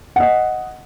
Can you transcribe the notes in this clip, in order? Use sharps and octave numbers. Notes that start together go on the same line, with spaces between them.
D#5 F#5